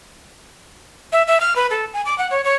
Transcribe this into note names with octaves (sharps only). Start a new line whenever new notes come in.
E5
E5
F6
B4
A4
G#5
D6
F#5
C#5
C#5